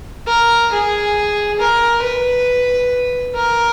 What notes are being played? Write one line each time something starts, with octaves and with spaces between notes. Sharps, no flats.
A#4
G#4
A#4
B4
A#4